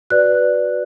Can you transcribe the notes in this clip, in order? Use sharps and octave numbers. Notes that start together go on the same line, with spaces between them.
F#4 B4 D5 F#6